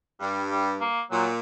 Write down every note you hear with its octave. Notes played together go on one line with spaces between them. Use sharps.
G2 G3
G3
A#3
A#2 F#3